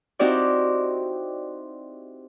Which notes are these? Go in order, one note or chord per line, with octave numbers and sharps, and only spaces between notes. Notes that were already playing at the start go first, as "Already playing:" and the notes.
C4 D#4 E4 F#4 G4 D5